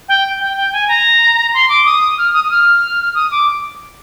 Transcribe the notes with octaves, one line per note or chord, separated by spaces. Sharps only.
G5
G5
G5
G#5
A#5
C6
D6
D#6
F6
D#6
D#6
F6
D#6
D6